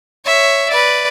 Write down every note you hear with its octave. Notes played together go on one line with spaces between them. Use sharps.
C#5 E5
B4 D5